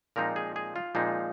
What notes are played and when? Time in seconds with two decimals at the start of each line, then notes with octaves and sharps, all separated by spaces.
0.16 A#2 F3 G#3 C4 D#4 A#4
0.36 G#4
0.56 G#4
0.76 F4
0.95 A#2 F3 G#3 C4 D#4